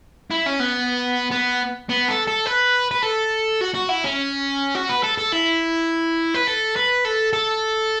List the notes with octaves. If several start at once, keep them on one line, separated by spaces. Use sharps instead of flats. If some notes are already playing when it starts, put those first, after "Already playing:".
E4
C#4
B3
B3
B3
A4
A4
B4
B4
A4
F#4
F#4
E4
C#4
F#4
B4
A4
A4
E4
B4
A4
B4
A4
A4